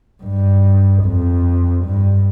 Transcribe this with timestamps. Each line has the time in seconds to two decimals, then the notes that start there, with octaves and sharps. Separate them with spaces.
0.23 G2
1.03 F2
1.84 G2